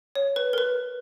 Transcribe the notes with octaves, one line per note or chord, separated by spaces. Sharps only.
C#5
B4
A#4
B4